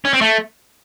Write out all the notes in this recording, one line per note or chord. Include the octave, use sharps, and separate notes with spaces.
C#4
C4
A3